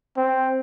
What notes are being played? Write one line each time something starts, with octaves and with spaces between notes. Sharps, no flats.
C4